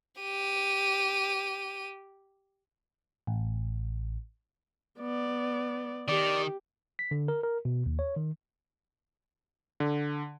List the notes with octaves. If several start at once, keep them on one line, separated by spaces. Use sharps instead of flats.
G4 D#7
A1
B3 D5
D#3 G4 D5
B6
D3
A#4
A#4
B2
D#2
C#5
D#3
D3